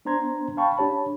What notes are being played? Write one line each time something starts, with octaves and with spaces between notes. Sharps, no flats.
B3 D4 C5 A#5 C6 G#6
F5 G5 A5 B5 C#6
D4 G4 C#5 A5 B5